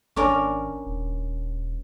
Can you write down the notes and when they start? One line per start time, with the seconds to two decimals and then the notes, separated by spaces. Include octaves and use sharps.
0.16 G#1 C#4 D4 A#4
0.86 D#1